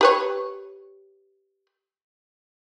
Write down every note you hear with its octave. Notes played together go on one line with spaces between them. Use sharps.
G4 B4 C#5